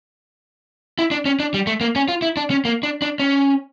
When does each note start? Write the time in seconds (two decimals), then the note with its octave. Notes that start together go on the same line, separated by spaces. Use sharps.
0.99 E4
1.11 D4
1.25 C#4
1.40 D4
1.54 G3
1.67 A3
1.81 A#3
1.96 C#4
2.08 F4
2.22 E4
2.37 D4
2.50 C#4
2.65 A#3
2.83 D4
3.02 D4
3.20 C#4